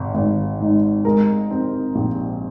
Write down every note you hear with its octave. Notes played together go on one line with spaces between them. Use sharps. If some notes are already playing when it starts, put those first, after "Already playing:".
Already playing: G#1
G#1
G#2
G#3 A#4
C4
A#1